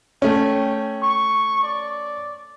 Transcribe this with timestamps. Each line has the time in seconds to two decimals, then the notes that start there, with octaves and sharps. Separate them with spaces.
0.22 A3 C#4 G5
1.03 C#6
1.63 D5